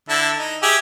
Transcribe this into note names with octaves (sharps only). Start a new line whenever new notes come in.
D3 E4 A5
D#4
G4 G#4 E5